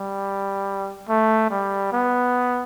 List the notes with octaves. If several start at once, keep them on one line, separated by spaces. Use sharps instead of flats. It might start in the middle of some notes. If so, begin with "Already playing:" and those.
Already playing: G3
A3
G3
B3